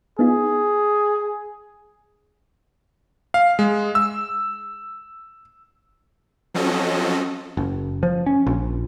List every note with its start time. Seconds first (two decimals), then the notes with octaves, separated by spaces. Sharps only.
0.19 B3 D#4 F4 G#4
3.34 F5
3.59 G#3
3.95 E6
6.54 F3 F#3 C4 C#4 A4 D#5
7.57 F#1
8.03 F3
8.26 C#4
8.46 A#1